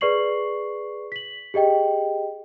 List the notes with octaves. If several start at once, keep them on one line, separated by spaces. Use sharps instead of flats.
G#4 B4 D5 C#6 C7 F#7
B6 F#7
G4 G#4 D#5 G5